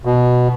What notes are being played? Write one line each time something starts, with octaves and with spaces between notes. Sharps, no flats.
B2